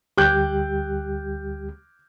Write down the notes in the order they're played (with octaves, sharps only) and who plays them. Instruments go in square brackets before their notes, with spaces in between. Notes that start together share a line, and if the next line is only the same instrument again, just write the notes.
[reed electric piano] D2 G3 G4 [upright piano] D6 F#6 G6